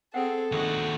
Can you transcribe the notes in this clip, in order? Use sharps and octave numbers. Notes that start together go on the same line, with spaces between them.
C4 G#4 A4 C5 F#5 G5
D#2 D#4 F#4 G#4 B4